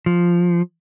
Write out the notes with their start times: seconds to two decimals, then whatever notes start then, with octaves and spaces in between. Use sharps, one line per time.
0.06 F3